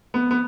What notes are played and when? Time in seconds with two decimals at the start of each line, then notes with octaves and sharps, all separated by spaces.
0.14 B3
0.31 B3